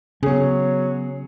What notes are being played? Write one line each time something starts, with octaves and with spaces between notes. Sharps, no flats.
C#3 F#3 B3 C#4 G#4 C#5